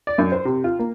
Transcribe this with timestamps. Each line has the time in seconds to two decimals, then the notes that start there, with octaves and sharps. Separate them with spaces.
0.07 D5
0.18 F#2
0.32 C5
0.45 C3
0.64 F4
0.79 A#3